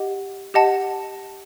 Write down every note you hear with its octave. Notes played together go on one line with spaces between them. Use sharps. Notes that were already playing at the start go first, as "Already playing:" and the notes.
Already playing: G4 D#5 F#5
G4 D#5 F#5 A5